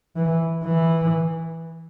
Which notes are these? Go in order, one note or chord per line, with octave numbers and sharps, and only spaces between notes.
E3
E3